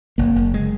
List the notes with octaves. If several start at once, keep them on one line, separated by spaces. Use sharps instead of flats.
F#1 A#3
F#1
G#3